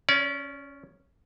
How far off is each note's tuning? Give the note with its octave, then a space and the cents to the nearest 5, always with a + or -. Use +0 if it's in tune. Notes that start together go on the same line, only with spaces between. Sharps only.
C#4 +0 D5 -35